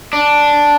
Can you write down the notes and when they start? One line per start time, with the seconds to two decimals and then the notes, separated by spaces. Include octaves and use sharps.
0.13 D4